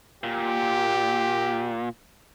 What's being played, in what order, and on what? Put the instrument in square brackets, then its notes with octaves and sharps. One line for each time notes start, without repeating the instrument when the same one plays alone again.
[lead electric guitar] A#2 [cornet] G4